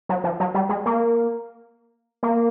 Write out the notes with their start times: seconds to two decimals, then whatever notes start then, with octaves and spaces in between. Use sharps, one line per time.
0.09 F#3
0.24 F3
0.40 F#3
0.54 G3
0.69 G#3
0.86 A#3
2.23 A#3